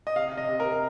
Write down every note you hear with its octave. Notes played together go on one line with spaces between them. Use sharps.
D#5
C3 F5
C3
D#5
C3
A#4
C3